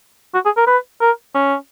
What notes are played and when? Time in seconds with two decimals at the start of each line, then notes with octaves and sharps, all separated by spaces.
0.34 F#4
0.45 G#4
0.57 A#4
0.67 B4
1.01 A#4
1.34 C#4